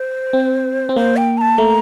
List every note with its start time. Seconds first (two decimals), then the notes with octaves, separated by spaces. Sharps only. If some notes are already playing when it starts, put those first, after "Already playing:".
Already playing: C5
0.33 C4
0.89 C4
0.96 A#3 C5
1.17 G5
1.38 A#5
1.41 A5
1.58 A3 A#5